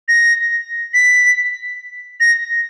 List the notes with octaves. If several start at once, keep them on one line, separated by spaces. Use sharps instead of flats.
A#6
B6
A#6